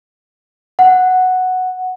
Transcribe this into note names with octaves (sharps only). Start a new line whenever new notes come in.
F#5